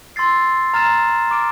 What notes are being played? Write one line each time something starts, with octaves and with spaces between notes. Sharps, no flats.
C6 E6 A6 C7
A#5 F6 A6 C7 E7
D6 F6 A6 D7